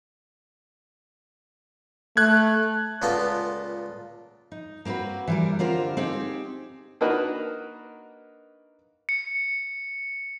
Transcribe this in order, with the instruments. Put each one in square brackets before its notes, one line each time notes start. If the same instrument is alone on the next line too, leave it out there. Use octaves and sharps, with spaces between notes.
[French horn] A3 [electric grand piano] F#6 G#6
[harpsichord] C#2 A#2 B3 F4 A4 A5
[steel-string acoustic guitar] D#4
A#3 C4 E4 F#4 B4
E3 G3 A#4
D3 C4 F4 G4 A#4 C5
C4 D#4 G4 G#4
[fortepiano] A#3 D4 D#4 F#4 A#4 B4
[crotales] C#7